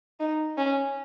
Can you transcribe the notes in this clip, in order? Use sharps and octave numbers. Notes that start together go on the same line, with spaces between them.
D#4
C#4